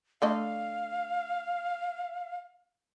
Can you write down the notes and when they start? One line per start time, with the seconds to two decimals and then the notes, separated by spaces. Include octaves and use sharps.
0.22 D3 A3 D#5 F5